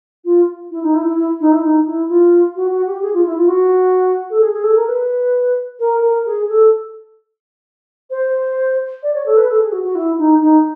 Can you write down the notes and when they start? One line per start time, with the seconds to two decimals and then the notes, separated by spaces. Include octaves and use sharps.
0.25 F4
0.71 E4
0.83 D#4
0.94 E4
1.05 E4
1.17 E4
1.40 D#4
1.52 E4
1.64 D#4
1.86 E4
2.09 F4
2.56 F#4
2.71 F#4
2.87 G4
3.02 G#4
3.14 F4
3.25 E4
3.37 F4
3.48 F#4
4.30 A4
4.41 G#4
4.52 G#4
4.64 A4
4.75 A#4
4.87 B4
5.79 A#4
6.02 A#4
6.26 G#4
6.49 A4
8.10 C5
9.03 D5
9.14 C#5
9.26 A4
9.37 B4
9.49 A4
9.61 G#4
9.72 F#4
9.84 F#4
9.95 E4
10.18 D#4
10.41 D#4